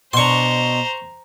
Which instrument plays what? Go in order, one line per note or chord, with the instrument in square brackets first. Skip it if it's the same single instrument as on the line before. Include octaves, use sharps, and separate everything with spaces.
[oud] B2 D4 [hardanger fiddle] C5 A#5 [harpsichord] C6 C#6